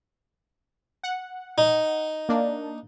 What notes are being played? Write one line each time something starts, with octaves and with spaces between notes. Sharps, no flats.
F#5
D#4
A#3 D4